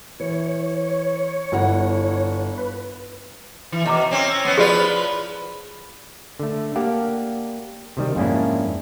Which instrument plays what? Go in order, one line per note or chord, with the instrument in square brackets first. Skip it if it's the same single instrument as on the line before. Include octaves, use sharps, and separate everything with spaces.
[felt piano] E3 [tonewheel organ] C#5
[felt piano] G1 E4 F#5
[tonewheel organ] B4
[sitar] E3
[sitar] B2 [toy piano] C#5 A#5 D6
[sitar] C4 C#4
B3 C#4
[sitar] F3 F4 B4 [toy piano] G#4 D5
[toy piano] E4 C5
[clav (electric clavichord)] D3 A3
A#3 G4 D5 F5 F#5 A5
C3 D#3 G3
F2 G#2 A#3 C#4 D4 E4